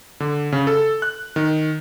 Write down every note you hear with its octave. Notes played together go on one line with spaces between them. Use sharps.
D3
C#3
A4
F#6
D#3